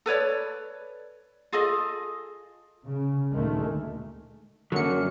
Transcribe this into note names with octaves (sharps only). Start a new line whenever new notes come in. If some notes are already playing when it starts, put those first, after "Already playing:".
A4 B4 C#5 D5
F4 G#4 A4 D#5
C#3
D2 A#2 D#3 G#3 A3
F#2 D3 F#3 A#3 C#7